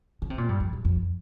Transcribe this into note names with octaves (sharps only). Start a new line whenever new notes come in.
C#3
C3
A#2
G2
F2
G2
F2